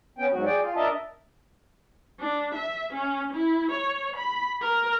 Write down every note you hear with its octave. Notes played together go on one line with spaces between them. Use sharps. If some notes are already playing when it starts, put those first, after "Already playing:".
B3 C#4 G5
G#2 F#3 F#4
G#4 D5 G5
F4
D4 A#4 D#5 E5 A5
D4
E5
C#4
E4
C#5
B5
A#4